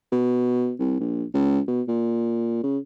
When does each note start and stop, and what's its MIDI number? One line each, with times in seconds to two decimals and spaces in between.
0.12 0.73 47
0.79 0.96 36
1.00 1.24 34
1.34 1.59 37
1.67 1.82 47
1.88 2.62 46
2.63 2.78 49